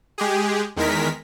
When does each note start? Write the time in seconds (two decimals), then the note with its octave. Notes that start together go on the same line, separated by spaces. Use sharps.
0.18 G#3 G4 G#4
0.76 E2 D#3 G#3 A#4 B6